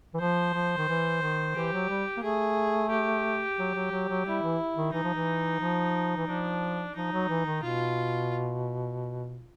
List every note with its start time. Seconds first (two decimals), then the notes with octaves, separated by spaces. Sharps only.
0.14 E3
0.20 F3 C5
0.54 F3
0.78 D#3
0.88 E3
1.21 D#3
1.55 E3 G4
1.73 F#3
1.89 G3
2.17 A#3
2.23 A3 G#4
2.90 G4
3.58 F#3
3.75 F#3
3.91 F#3
4.09 F#3
4.25 G3 E4
4.42 E3
4.76 D#3
4.93 E3 D#4
5.03 F3
5.14 E3
5.60 F3
6.17 E3
6.27 F3 D4
6.95 F3 D#4
7.12 F#3
7.29 E3
7.46 D#3
7.63 B2 F4